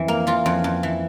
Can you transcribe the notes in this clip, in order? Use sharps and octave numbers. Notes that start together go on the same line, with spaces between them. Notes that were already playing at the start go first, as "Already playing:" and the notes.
Already playing: F2 E3
A#3
E3 F4
F2
F2
E3